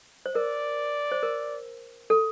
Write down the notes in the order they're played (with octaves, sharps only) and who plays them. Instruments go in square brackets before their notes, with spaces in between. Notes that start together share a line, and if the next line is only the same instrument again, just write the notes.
[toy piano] C5
[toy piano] A#4 [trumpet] D5
[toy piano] C5
A#4
A4